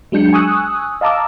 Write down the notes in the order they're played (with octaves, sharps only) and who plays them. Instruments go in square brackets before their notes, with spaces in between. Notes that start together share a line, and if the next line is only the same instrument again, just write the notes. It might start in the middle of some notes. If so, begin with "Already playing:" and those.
[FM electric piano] F#3 G#3 D4 G6 C#7
G#5 C#6 D#6 E6 F#6
D#5 F5 A5 A#5 D6 E6